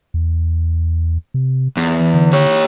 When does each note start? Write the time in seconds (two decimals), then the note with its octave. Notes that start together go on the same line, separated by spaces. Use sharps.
0.14 E2
1.34 C3
1.77 E2 E3
2.14 D3
2.33 G4 C#5